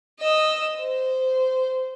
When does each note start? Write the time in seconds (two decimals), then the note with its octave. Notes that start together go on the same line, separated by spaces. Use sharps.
0.19 D#5 E6
0.77 C5